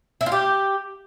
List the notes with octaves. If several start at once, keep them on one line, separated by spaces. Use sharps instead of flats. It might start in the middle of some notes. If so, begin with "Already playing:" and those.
E4
F4
G4